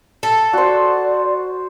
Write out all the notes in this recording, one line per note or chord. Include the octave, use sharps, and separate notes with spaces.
A4
F#4 C5 D5